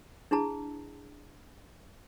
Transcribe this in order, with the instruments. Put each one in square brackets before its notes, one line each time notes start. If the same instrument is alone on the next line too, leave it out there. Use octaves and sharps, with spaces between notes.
[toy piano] D4 E4 G#4 A5 A#5